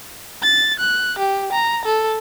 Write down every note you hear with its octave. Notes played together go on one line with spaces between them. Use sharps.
A6
F#6
G4
A#5
A4